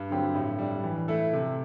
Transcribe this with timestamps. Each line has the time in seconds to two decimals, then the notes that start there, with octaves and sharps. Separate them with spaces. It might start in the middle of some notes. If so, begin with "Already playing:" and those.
Already playing: G2
0.10 D3 F#3 C4 G4
0.35 A2
0.59 G3 D4
0.84 E3
1.08 A3 E4 A4
1.33 C3